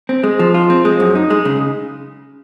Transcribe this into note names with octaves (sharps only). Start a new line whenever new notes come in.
C4
G#3
F3
F4
C4
G#3
F#2
D#4
G#3
C#3